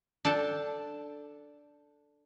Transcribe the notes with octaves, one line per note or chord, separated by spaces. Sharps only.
D4 A4 G5 A5